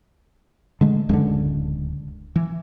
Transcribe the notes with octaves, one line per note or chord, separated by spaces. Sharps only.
D3 G#3 A3
D1 C#2 F#2 D3 G#3 C#4
E3